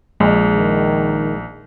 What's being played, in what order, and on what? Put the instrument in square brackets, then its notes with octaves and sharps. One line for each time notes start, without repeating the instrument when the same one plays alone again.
[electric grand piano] A#1 [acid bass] G#3
[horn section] D#3